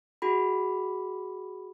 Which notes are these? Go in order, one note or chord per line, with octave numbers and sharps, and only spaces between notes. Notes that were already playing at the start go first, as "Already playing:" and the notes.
F#4 G#4 B5